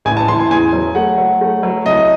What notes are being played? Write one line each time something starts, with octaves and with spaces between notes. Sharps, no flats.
A1 G#5
A5
E3 C6
G#5
E2 G#5
F#3
A3 F#5
F#3
A3
F#3
C2 D#5